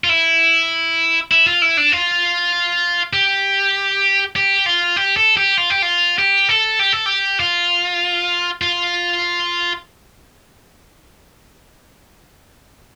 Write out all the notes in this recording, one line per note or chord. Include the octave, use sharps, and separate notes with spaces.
F4
E4
E4
F4
E4
D4
F4
G4
G4
F4
G4
A4
G4
F4
G4
F4
G4
A4
G4
A4
G4
F4
F4